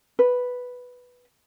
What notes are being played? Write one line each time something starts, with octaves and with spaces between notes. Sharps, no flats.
B4